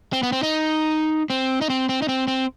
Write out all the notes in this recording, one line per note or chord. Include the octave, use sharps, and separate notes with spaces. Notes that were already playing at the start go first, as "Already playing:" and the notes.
C4
B3
C4
D#4
C4
D#4
C4
C4
D#4
C4
C4